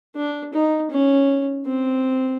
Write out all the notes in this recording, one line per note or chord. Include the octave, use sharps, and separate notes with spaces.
D4
D#4
C#4
C4